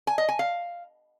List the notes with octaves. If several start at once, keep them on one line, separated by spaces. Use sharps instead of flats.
G#5
D#5
G#5
F5